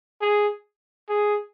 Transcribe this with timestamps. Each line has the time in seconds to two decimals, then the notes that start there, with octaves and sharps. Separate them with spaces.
0.21 G#4
1.09 G#4